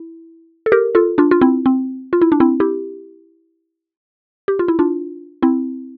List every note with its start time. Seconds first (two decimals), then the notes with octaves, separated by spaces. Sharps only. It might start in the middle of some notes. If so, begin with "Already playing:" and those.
Already playing: E4
0.66 A4
0.72 G4 A#4
0.95 F4 A4
1.18 D4 F4
1.31 F4
1.41 C4 E4
1.66 C4
2.13 F4
2.21 E4
2.32 D4
2.40 C4 E4
2.60 E4 G4
4.48 G4
4.59 F4
4.68 E4
4.79 D4 F4
5.42 C4 E4